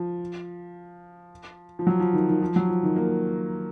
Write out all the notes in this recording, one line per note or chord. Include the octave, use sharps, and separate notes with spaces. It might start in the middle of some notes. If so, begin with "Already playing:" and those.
Already playing: F3
F3
F#3
F3
D#3
D#3
F3
F#3
F3
D#3
A#3